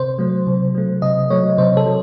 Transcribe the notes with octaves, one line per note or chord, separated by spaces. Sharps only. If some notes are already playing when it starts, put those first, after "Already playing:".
Already playing: C3 C5
F#3 A3
C3
F#3 A3
C3 D#5
F#3 A3 C#5
C3 C5
A4
F#3